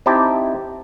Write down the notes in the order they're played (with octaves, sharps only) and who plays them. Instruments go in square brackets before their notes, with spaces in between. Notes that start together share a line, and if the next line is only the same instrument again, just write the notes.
[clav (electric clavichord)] C4 D#4 E4 G4 G5 A5